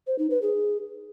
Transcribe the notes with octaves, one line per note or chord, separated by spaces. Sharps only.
C5
D#4
B4
G#4